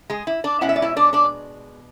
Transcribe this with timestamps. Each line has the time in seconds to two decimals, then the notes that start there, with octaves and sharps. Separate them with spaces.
0.10 G#3 G#4
0.27 E4
0.44 D4 D5
0.61 B2 G#3 C#4 E4 F#5
0.69 E5
0.76 D5
0.82 E4 E5
0.97 D4 D5
1.13 D4 D5